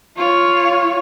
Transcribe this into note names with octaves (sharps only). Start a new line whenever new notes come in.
F4 C#5